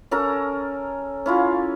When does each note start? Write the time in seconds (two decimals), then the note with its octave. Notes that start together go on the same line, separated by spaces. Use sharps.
0.11 C#4 A4 A#4 A#5
1.26 C#4 E4 F4